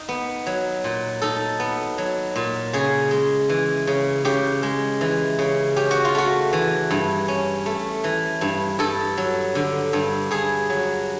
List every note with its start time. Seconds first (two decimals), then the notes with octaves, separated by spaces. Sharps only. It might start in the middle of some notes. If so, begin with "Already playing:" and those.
Already playing: D#4
0.09 B3
0.46 F#3
0.84 A#2
1.22 D#4 A4
1.60 B3
1.98 F#3
2.36 A#2
2.73 C#3 G#4
3.11 G#3
3.49 E3
3.87 C#3
4.25 C#3 G4
4.63 G#3
5.01 E3
5.39 C#3
5.76 C#4 G4
5.91 F#4
6.05 F4
6.15 A3 F#4
6.53 E3
6.91 G2
7.28 C#4
7.66 A3
8.04 E3
8.41 G2
8.79 G2 A4
9.18 F#3
9.55 D3
9.93 G2
10.31 G2 G#4
10.70 F#3